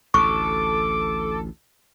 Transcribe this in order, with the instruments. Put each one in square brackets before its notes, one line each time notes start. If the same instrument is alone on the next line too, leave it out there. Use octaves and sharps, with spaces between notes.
[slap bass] A1 D2 [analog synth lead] A4 [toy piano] C#6 [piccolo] D6